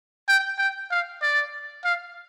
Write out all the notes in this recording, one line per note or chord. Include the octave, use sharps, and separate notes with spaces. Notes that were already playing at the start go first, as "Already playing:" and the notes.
G5
G5
F5
D5
F5